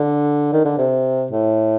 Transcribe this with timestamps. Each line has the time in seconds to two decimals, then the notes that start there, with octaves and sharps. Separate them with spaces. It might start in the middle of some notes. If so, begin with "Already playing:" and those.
Already playing: D3
0.53 D#3
0.65 D3
0.78 C3
1.31 A2